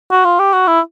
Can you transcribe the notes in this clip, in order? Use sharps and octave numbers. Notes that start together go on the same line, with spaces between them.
F#4
F4
G4
F#4
E4